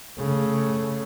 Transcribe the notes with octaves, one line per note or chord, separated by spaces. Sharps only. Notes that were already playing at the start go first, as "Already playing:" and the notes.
C#3 A3